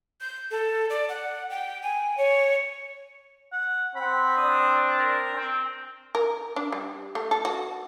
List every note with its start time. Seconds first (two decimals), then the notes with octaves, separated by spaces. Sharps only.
0.21 G6
0.51 A4
0.90 D5
1.09 F#5
1.50 G5
1.82 G#5
2.17 C#5
3.52 F#5
3.96 C4 F#5 B5
4.37 D4 D#6
4.98 A#4
5.34 C4
6.15 A#4
6.56 D4
6.72 G3
7.15 A3
7.31 A4
7.45 F#4